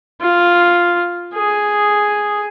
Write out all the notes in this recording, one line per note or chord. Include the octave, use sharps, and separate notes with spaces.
F4
G#4